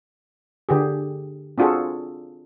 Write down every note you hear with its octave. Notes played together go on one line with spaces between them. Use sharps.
D3 G4 G#4
C4 D4 F4 F#4 G#4 A4